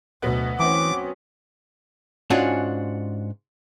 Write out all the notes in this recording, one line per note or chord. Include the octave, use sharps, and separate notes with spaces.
D2 B2 F#3 B3 F#4
E3 C4 C#4 D6
G#2 C#4 D4 F4 F#4